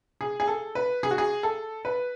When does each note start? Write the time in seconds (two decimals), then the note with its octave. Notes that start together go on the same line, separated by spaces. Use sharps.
0.21 G#4
0.40 G#4
0.48 A4
0.75 B4
1.03 G#4
1.11 F#4
1.18 G#4
1.43 A4
1.85 B4